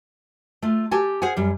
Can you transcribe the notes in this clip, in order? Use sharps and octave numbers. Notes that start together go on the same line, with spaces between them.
A3 F4
G4 A4 G#5 A5
G#4 C5 F5 F#5 G#5
F#2 G3